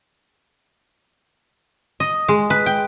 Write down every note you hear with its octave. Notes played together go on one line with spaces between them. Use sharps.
D#5
G#3
B4
G5